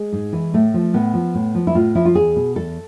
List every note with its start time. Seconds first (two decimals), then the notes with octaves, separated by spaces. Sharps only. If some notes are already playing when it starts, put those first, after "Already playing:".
Already playing: G#3
0.12 G#2
0.33 E3
0.54 A2 A3
0.74 F3
0.94 A2 B3
1.14 F3
1.35 A2
1.55 F3
1.67 E4
1.75 A2 F4
1.95 F3 E4
2.05 F4
2.15 E2 G#4
2.36 B2
2.56 E2 A4